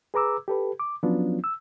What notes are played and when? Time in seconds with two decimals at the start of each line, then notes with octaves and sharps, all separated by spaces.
0.14 G#4 B4 A#5 D6 E6
0.48 G4 A4 B4
0.80 D6
1.03 F3 F#3 B3 C#4 D4 F4
1.44 E6